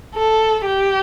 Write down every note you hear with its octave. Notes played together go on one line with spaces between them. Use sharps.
A4
G4